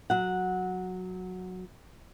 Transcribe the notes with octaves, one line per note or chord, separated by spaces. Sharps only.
F#3 F#5